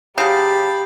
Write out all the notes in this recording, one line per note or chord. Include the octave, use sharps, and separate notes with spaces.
C#3 F#3 G4 A5 B5 D#6 G6 C7